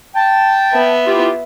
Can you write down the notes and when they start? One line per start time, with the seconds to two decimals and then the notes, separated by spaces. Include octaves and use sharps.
0.15 G5 A5
0.72 B3 E5
1.07 E4 F4 G4